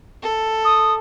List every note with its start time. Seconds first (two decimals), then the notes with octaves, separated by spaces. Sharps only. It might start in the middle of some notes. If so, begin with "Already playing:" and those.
0.22 A4
0.65 D#6